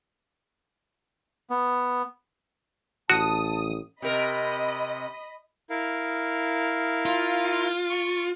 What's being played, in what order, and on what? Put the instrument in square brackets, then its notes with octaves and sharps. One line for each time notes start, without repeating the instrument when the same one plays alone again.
[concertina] B3
[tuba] A1 [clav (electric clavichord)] F#4 [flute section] A5 [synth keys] D#6
[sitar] C3 A#4 [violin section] D#5 B5
[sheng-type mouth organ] E4 A#4 F5
[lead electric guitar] F4
[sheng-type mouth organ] C#6